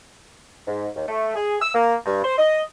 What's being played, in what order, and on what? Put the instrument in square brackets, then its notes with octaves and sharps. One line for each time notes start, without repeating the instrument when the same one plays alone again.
[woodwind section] G#2
D#2
A3
G#4
E6
A#3
G2
C5
D#5